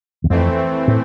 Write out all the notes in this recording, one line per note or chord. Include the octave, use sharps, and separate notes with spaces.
E2
F2 E3 A3 C4
A2